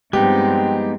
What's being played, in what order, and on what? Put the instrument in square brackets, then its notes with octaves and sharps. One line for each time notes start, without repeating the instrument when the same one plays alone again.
[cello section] G2 F3 C4 [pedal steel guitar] G#3 B3 D#4 [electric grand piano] G4 [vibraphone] G5